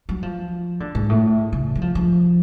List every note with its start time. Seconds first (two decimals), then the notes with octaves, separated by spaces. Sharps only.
0.09 F#3
0.23 F3
0.80 D3
0.95 G#2
1.10 A2
1.53 C#3
1.75 F#3
1.82 F3
1.95 F3